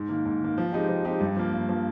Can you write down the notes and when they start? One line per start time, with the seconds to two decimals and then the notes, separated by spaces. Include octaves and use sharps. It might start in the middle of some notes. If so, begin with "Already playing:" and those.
Already playing: G#2
0.09 D#3 A#3
0.25 G#2
0.42 D#3 A#3
0.58 F3
0.72 G#3 C4 D#4 G4
0.89 F3
1.04 G#3 C4 D#4 G4
1.20 G2
1.36 F3 A#3
1.53 G2
1.69 F3 A#3